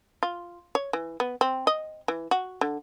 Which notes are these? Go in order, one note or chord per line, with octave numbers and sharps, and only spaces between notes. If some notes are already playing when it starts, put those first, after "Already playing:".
F4
C#5
E3
B3
C4
D#5
E3
F#4
D3